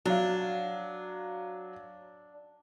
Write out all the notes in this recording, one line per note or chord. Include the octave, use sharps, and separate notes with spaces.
F#3 D4 F5